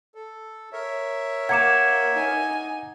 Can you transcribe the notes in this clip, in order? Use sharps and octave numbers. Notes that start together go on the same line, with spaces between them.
A4
A#4 C#5 E5
A#3 F#5 A#5 D6 G#6 C#7 E7
D#4 G#5